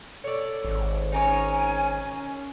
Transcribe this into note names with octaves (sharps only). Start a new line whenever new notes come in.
A4 C#5 D5
G#1
C#4 D#4 A#4 C#5 G#5